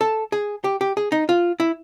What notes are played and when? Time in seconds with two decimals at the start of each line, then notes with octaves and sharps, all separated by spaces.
0.01 A4
0.32 G#4
0.64 G4
0.81 G4
0.97 G#4
1.12 D#4
1.29 F4
1.60 E4